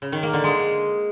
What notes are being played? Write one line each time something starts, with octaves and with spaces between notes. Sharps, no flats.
C#3
D#3
A#3
D3
G#3